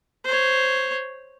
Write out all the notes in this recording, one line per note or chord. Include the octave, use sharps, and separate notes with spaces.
C5 C#5